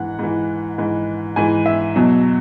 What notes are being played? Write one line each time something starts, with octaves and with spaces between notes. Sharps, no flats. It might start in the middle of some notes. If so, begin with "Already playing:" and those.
Already playing: G#2 E3 F#5
G#2 E3
G#2 E3
G#2 E3 G#5
E5
E2 B2 F#3